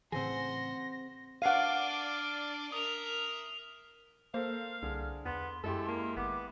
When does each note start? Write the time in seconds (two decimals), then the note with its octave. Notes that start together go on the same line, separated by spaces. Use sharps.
0.12 A2 C#3 E3 C4 G#4 C5 F#5 A#6
1.42 D4 D5 F5 F#5 F6 C7 D#7
2.72 A#4 E5 D#6 F7
4.34 A#3 A4 A#4 C5 F5 F6
4.83 C2 D3 G#4
5.25 E2 B3 C6
5.64 F#2 G#3 E4 G4 A4
5.89 A#3
6.16 G#1 B3 D6